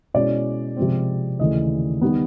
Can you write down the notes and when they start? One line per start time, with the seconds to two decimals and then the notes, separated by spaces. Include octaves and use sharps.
0.14 B2 G#3 C#4 E4 D5
0.77 C3 F3 G#3 C4
1.39 D#2 C#3 E3 A3 D#5
2.01 D#3 G3 B3